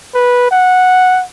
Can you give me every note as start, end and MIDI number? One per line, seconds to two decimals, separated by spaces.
0.14 0.48 71
0.51 1.23 78